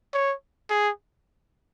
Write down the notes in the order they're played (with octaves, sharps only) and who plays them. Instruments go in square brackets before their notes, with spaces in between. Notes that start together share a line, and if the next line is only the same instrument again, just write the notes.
[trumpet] C#5
G#4